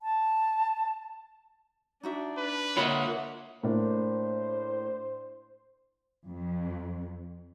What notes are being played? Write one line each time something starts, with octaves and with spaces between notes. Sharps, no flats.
A5
D4 D#4 F#4 E5
B4
A#3 F4 C#5 D#5 E5 F#5 B5
A2 A#3 D4 C5
F2